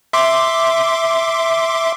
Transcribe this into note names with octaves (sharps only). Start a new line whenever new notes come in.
E5 C6 D6